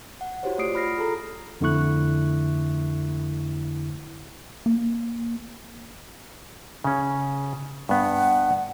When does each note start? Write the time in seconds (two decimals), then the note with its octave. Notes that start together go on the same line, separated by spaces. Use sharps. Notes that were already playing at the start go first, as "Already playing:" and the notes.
0.21 F#5
0.43 E4 F#4 G4 C5 C#5
0.58 A3 F4 D5 D#6 C7 D7
0.74 F4 B5 F6 A#6 C7
0.98 G#4 A4 A#5
1.61 F2 D3 A3 E4 C#6 F#6
4.66 A#3
6.84 C#3 C#4
7.89 G2 B3 F#5